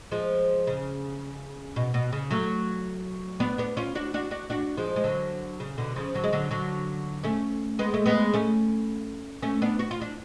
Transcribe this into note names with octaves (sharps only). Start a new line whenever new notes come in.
F3 G#3
C#3
B2
B2
C#3
F#3 A3
B3 D4
B3 D4
C#4 F4
D4 F#4
D4 F#4
D4 F#4
D4 F#4
F3 G#3
G#3
D3 F#3
C#3
B2 D3
C#3 F3
D3 F#3
G#3
D3 F#3
D3 F#3
A3 C#4
G#3 B3
A3
G#3 B3
A3 C#4
A3 C#4
B3 D4
F#4
F4
D4